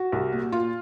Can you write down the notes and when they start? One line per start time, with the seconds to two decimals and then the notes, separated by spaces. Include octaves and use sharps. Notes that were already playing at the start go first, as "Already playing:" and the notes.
Already playing: F#4
0.12 C2
0.32 A#2
0.52 A#2 F4